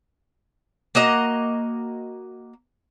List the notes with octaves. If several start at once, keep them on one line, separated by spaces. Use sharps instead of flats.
A#3 F#4 D#5 A#5